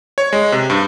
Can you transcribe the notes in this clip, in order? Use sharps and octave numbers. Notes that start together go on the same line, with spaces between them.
C#5
G#3
C3
G2